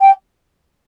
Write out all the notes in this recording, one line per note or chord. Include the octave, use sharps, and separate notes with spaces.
G5